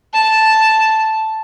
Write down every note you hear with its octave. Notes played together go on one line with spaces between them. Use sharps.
A5